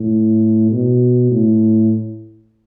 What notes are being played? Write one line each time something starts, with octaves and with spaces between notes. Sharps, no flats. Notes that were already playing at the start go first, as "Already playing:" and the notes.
Already playing: A2
B2
A2